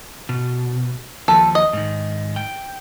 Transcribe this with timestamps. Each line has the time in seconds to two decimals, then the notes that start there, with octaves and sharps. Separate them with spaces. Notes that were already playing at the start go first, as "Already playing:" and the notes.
0.29 B2
1.28 D#2 F3 A4
1.55 D#5
1.73 G#2 D#3
2.36 G5